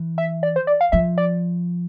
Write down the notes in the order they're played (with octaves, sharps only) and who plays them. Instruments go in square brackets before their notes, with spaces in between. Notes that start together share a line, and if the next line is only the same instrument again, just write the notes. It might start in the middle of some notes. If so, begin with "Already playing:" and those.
Already playing: [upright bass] E3
[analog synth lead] E5
D5
C5
D5
F5
[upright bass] F3 [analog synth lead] E5
[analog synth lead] D5